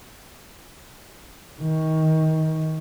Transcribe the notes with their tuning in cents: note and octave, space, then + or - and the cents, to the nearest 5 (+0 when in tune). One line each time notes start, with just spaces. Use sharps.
D#3 +25